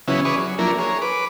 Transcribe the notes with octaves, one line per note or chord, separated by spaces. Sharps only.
C#3 E3 F#3 B3 C#4 E4
G#4 B4 C#5 D5 C#6 D#6
F#3
F3 F#3 A#3 D4 E4 A#4
G#4 A#4 C#5
B4 D6